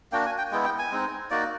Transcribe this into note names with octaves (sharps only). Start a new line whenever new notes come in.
A#3 D4 F#4 G5
G#5
G5
G#3 B3 E4 G5
G5
G#5
G#3 C4 D#4
A#3 D#4 F#4 D5